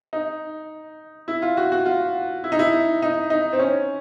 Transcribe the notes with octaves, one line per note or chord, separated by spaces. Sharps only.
D#4
E4
F4
F#4
F#4
F4
E4
D#4
E4
D#4
D#4
C4
C#4